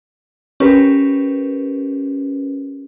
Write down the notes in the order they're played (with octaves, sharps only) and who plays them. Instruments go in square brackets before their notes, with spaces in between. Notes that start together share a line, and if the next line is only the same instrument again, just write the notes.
[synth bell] C#4 G4 A#4 B4